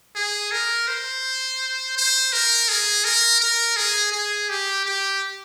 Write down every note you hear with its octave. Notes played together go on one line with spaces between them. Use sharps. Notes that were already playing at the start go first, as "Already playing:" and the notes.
G#4
A#4
C5
C5
A#4
G#4
A#4
A#4
G#4
G#4
G4
G4